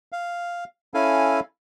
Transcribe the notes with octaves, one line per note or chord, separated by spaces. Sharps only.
F5
C#4 E4 A4 F5 G#5